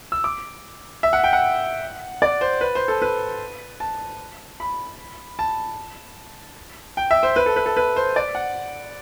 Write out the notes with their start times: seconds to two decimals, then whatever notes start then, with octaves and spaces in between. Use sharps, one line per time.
0.12 E6
0.24 D6
1.03 E5
1.13 F#5
1.24 G5
1.33 F#5
2.22 D5
2.41 C5
2.61 B4
2.75 C5
2.88 A4
3.02 B4
3.80 A5
4.60 B5
5.39 A5
6.97 G5
7.11 E5
7.23 C5
7.36 B4
7.46 A4
7.56 B4
7.66 A4
7.77 B4
7.96 C5
8.16 D5
8.35 F#5